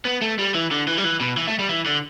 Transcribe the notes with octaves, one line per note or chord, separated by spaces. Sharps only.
B3
A3
G3
E3
D3
E3
G3
E3
B2
E3
A3
G3
E3
D3